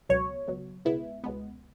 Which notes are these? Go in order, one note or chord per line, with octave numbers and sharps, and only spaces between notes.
C#2 B2 F#3 C#5
C#2 B2 F#3
C#2 B2 G#3 B3 E4
C#2 B2 G#3 B3